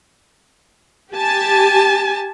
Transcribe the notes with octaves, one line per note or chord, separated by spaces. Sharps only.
G4 G#5 A5